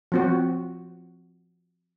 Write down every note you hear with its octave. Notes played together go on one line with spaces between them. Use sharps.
F3 C4 F#4